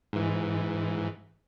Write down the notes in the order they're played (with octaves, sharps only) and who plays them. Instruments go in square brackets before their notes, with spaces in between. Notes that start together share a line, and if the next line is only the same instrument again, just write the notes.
[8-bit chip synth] G#2 E3